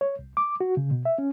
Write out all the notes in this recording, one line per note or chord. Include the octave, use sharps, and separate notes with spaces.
C#5
C2
D6
F#4
C#3
B2
E5
C#4